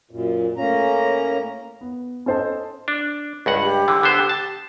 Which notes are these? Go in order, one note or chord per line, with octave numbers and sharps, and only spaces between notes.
F#2 A#2
A2 A#3 C#4 A#5
B3
C#4 A4 C5 D#5 A5
D4
C#2 G2 F#5
G4
D3 E3
D3 B3 C5
A5